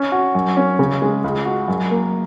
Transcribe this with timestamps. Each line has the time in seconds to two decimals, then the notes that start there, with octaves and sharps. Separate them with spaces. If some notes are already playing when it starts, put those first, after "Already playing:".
Already playing: C#4
0.12 F#4
0.35 F#2
0.57 C#4
0.79 C#3
1.02 G#3
1.24 C#2
1.45 F#4
1.68 F#2
1.91 A#3